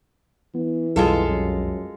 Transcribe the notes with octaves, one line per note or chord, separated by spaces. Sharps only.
E3 B3
B1 F2 G3 G#3 F4 A4
F#2